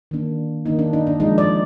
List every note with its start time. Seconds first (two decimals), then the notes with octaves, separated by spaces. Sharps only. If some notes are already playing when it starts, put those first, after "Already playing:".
0.11 D#3 A#3 D4
0.66 D#3 A#3 D4 D#4
0.79 D4
0.93 D#4
1.07 D4
1.20 F3 G#3 D4 D#4
1.38 D5